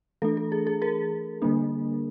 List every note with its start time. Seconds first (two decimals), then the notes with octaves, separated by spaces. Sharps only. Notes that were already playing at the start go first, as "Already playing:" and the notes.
0.22 E3 A3 D4 A4
0.37 A4
0.52 G#4
0.67 G#4
0.82 G#4 A#4
1.42 D3 G3 A#3 D4